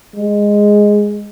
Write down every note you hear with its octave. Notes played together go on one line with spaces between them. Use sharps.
G#3